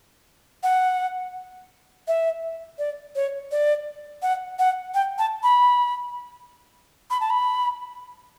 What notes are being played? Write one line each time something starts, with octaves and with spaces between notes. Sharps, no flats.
F#5
E5
D5
C#5
D5
F#5
F#5
G5
A5
B5
B5
A5
B5